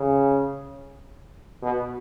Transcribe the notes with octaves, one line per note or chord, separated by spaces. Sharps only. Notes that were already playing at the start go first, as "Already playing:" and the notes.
Already playing: C#3
B2